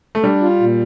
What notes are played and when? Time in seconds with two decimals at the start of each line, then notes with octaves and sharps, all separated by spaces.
0.15 A3
0.23 G3 D4
0.42 F4
0.60 A#2